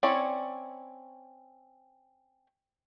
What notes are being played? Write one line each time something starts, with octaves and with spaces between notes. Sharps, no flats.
C4 C#4 E4 C#5 D5